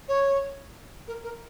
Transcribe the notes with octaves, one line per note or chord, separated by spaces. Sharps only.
C#5
A#4
A#4